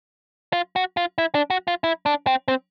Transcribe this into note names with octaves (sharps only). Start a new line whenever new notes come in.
F4
F#4
F4
E4
D4
F#4
F4
E4
D4
C4
C4